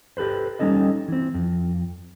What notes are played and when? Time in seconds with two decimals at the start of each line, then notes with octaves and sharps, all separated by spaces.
0.17 G4 A4 B4 C5
0.59 G3 C#4 D#4 A4 D#5
1.08 E3 C4
1.34 F2